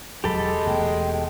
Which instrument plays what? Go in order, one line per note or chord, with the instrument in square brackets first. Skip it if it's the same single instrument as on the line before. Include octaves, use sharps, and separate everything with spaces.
[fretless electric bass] E1 F#3 [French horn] G#3 [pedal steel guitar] G4 A4 B5
[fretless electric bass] E1 B2 A3 [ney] G5